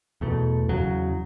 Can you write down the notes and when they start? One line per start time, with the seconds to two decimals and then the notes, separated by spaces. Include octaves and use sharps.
0.21 E2 B2 A3
0.69 E2 C#3 F#3